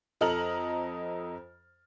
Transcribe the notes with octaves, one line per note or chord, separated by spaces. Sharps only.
F2 A4 D#5 A#5 F6 F#7